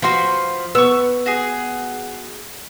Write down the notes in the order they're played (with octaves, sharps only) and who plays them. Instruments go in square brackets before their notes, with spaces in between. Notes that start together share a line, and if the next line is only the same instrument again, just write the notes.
[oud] F3 F#4 [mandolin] B4 B5 C6
[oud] B3 [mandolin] C#6 E6
[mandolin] F#4 G#4